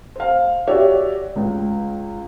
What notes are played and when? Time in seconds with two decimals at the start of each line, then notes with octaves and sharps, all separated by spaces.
0.16 C5 F5
0.67 F#4 G4 C#5 D5 E5
1.36 C#2